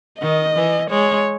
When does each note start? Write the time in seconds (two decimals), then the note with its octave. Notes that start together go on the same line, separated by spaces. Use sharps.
0.21 D#3 D#5
0.56 E3
0.90 G#3 C#5